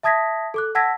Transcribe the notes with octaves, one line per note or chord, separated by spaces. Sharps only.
E5 A5 D#6 G#6 A#6 B6
A4 D6 F#6
F#5 A5 E6 G#6 A#6 B6